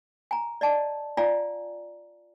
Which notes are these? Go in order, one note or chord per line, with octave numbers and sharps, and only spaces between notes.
G#5 A#5
D5 D#5 A5
F4 D5 F5 G#5 A#5